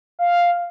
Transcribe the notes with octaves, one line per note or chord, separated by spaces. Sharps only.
F5